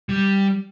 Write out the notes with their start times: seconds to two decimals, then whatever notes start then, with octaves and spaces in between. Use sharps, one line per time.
0.09 G3